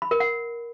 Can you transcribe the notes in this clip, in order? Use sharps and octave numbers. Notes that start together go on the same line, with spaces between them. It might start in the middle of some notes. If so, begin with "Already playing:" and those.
B5
A#4
F#5